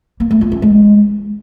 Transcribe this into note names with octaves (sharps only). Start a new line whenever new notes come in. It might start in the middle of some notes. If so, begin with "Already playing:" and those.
A#3
A3
F4
C#4
G#3